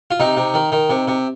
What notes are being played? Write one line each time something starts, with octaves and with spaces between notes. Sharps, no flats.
F4
C3 D#4
C3
D#3
D#3
C3
C3